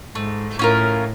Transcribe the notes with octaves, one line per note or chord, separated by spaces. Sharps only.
G#2 A3
A2 C#4 F4 A#4